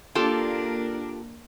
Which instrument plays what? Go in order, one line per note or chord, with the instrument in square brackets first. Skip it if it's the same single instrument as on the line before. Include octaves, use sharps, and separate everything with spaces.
[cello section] A#3 D4 A#4 [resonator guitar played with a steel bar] F4 G4 A4